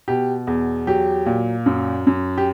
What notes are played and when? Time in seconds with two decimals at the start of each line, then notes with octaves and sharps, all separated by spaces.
0.08 B2 G4
0.47 E2
0.87 F#3 G4
1.26 A#2
1.66 F#2
2.07 F#2
2.38 G4